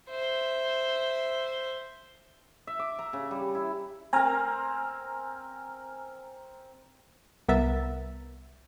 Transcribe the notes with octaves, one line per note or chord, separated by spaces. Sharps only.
C5 E5
E5
D6
A#5
C#3
G3
E4
C4 A#4 G#5 A#5 F6
C2 B3 A#4 E5 A6